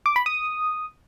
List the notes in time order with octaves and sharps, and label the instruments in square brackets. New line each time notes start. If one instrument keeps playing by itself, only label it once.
[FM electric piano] D6
B5
D#6